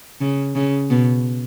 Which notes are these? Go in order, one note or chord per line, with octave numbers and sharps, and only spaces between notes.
C#3
C#3
B2